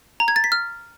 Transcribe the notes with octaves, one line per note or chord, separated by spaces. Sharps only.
A#5
G#6
A6
B6
F6